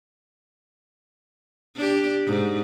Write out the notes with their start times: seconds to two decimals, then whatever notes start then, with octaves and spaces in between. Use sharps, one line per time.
1.76 D4 G4
2.27 G#2